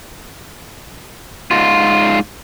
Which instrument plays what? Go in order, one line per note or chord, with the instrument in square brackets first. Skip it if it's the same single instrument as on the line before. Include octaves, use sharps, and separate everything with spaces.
[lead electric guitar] G#2 F4